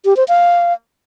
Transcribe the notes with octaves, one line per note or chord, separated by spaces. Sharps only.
G4
C5
F5